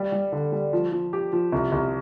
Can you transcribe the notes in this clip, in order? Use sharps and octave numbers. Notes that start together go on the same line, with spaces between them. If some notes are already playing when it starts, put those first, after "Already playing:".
Already playing: G3
G3
D3
G3
F3
F3
G4
F3
C2
C2